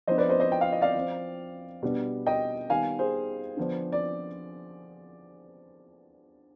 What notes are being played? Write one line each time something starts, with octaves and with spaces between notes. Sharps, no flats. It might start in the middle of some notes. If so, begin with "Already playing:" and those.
F3 B3 D4 C5 D#5
B4 D5
C5 D#5
C5 D#5
G5
F5
D#5
D5 F5
F3 C4
B2 G3 B3 D4
D#5 G5
D#3 G3 B3 F5 G#5
G#4 C5
D3 F3 B3 D4
D5